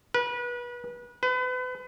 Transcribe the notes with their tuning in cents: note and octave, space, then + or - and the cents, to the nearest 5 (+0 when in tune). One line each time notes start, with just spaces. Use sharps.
B4 -30
B4 +35